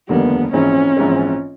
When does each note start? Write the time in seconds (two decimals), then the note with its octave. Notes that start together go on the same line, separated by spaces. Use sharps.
0.09 F1 D#2 D3 G3 A#3 B3
0.53 A#1 G#2 E3 G#3 C4 C#4
0.97 A#1 G#2 E3 G#3 C4